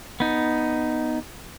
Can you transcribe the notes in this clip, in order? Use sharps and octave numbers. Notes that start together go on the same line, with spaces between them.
B3 D#4